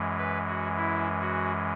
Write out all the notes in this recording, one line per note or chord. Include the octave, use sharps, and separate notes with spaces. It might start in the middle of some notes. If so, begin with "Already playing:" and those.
Already playing: F#2 E3 G#3
B4
F#4
E4
F#4